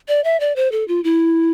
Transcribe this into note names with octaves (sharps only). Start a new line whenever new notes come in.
D5
E5
D5
C5
A4
F4
E4